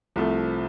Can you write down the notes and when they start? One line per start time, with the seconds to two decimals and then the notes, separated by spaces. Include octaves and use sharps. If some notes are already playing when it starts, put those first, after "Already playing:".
0.16 C2 C3 F3 A3